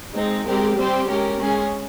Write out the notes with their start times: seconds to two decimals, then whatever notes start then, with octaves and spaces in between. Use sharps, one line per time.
0.15 G#3 C4 D#4
0.46 G#3 C4 G4 A#4
0.77 G3 C4 G4 C5
1.07 G#3 C#4 G4 A#4
1.39 G#3 C#4 G#4